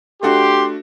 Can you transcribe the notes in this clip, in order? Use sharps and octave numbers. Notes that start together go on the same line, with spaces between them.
A3 D4 F#4 G4 C6